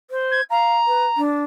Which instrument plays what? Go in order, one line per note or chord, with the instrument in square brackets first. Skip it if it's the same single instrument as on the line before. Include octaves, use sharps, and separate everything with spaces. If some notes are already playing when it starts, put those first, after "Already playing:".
[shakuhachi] C5
[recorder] G#6
[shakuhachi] F5 [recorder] A#5
[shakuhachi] B4
D4